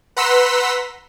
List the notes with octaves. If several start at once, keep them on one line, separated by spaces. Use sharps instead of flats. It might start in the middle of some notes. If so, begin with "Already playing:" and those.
B4 F#5 A#5 C6 E6 B6